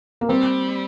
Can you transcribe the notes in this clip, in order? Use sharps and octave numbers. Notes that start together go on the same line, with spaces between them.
A#3
G3 C4